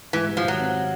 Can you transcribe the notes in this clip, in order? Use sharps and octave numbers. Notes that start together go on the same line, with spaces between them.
G#2 E3
G3
F3
D#3 F#3
C4